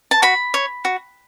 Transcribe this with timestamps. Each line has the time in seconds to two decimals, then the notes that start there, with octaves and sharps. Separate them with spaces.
0.11 A5
0.22 F#4 B5
0.54 C#5
0.85 F#4